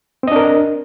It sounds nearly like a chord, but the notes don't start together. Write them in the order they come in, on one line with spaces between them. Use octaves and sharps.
C4 D#5 D4 A#4